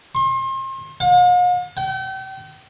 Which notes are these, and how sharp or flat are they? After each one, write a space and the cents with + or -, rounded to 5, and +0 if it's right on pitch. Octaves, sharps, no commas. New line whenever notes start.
C6 +35
F5 +45
G5 -40